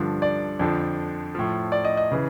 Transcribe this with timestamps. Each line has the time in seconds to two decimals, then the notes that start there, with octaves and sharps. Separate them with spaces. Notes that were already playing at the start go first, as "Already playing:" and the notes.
Already playing: G2 D3 F3
0.22 D5
0.59 F2 D3 F3
1.35 A2 F3
1.72 D5
1.85 D#5
1.97 D#5
2.12 C#3 E3